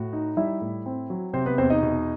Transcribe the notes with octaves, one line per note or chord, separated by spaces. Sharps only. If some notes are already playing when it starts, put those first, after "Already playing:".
Already playing: A2 F#4
D#4
G3 E4 E5
A2
C4
F#3
C3 C4 C5
B3 B4
E2 C4 C5
D#4 D#5
B2